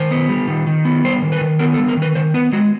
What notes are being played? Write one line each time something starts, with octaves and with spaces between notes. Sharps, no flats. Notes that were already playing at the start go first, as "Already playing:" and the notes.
Already playing: D#3 C5
B3
G3
D#3
D#3
B3
G3 C5
D#3
B4
D#3
B3 A#4
A4
G3
A#4
D#3
B4
D#3 C5
B3 B4
G#3 F#4